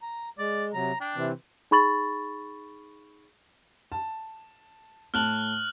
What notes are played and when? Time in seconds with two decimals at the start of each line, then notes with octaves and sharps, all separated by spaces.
0.02 A#5
0.39 G#3 D5
0.74 C3 F#3 A#5
1.01 D4 G5
1.16 C3 E3 C4
1.71 D#4 G#4 B5 C#6 A6 F#7
3.92 A5
5.14 A2 A5 F6 F#6 F#7